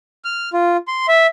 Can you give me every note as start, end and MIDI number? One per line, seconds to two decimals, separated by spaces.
0.25 0.50 89
0.53 0.77 65
0.88 1.06 84
1.08 1.27 76